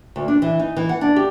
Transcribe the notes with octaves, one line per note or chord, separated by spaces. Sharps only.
D2
D4
E3
D#4
E3
F#5
D4
G4